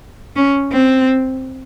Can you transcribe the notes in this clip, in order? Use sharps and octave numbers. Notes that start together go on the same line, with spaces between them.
C#4
C4